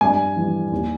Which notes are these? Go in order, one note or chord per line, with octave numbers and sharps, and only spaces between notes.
G2 G#5
E3 G3
D#2